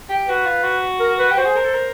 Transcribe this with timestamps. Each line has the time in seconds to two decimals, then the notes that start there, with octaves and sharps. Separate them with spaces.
0.09 G4
0.28 F#4 B4
0.46 F4
0.64 F#4
1.00 A#4
1.19 B4
1.30 G4
1.37 F#4 C5
1.45 G#4
1.56 A#4
1.65 A4
1.73 A#4